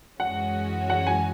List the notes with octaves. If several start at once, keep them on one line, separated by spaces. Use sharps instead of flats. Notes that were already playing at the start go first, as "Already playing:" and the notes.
F#2 E3 G#3 C#4 F#4 F#5
F#5
G#5